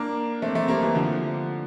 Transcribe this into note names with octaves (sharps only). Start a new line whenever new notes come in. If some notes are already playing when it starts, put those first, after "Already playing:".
Already playing: A#3 D4
A3 C4
A3 C4
G3 A#3
E3 G3
D3 F3